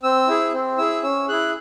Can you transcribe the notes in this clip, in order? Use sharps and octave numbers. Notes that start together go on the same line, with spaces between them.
C4 E6
E4 G#4
C4
E4 G#4 E6
C#4 E6
E4 G#4 F#6